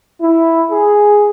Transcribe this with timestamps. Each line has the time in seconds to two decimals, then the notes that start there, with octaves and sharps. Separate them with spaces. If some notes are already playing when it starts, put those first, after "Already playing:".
0.21 E4
0.72 G#4